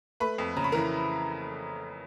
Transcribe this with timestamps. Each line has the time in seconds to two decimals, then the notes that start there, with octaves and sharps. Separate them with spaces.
0.20 A3 B4 B5
0.38 F2
0.57 C#3 A#5
0.64 B5
0.72 E3 A#4 A#5